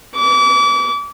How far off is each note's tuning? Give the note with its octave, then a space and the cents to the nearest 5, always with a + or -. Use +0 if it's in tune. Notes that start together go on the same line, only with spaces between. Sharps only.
D6 -35